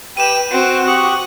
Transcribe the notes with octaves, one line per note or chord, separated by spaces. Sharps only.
G4 B4 G5 D#7 E7
C4 F#4 F#5
G4 F#5 C#6 D#6